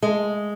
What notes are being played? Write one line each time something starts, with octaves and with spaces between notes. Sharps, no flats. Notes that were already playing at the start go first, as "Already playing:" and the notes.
G#3